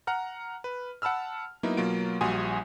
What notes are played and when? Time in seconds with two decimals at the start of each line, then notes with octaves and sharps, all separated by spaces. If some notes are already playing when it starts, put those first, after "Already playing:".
0.07 F#5 A#5 F6
0.64 B4
1.02 F#5 A5 B5 E6 F6
1.63 F#3 A#3 B3 D#4 E4
1.77 B2 F#3 A#3 F4 D7
2.21 A#1 G3 F#4 G#5 C6 D#6